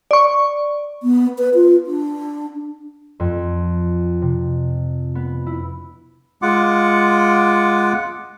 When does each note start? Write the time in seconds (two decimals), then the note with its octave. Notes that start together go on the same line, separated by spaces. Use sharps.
0.11 D5 C#6
1.03 B3
1.38 B4
1.55 F4
1.87 D4
3.20 F2
4.22 C3
5.15 B3
5.46 E4
6.42 G#3 F4 F#5 D6